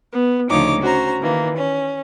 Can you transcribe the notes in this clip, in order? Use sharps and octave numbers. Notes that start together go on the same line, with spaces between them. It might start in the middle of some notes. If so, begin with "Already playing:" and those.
B3
D2 C#3 F3 D#4 C#5 D6
C#4 F#4 C5 A#5
D#3 E3 A#3
C#4